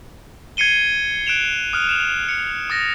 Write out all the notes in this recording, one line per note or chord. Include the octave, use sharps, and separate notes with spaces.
G#6 C7 C#7 D#7 G7
F#6 D7 E7 F7
D#6 F6 F#6 D#7 F7
E7
C#7
D#6 A6 A#6